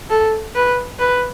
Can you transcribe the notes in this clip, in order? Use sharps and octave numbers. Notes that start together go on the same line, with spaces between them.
A4
B4
B4